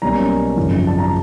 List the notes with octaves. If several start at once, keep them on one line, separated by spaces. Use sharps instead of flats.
B1 B2 G3 A#3 C#4 A#5
G#1 F#2 C#3 F3
A5
A#5